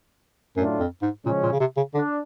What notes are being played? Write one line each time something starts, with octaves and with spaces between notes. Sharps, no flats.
F#2 A2 F#3 A3 D4 F4
F2
G#2
A#2 C#3 F3 G#3 C#4
A#2
C#3
C3
C#3
D3 D4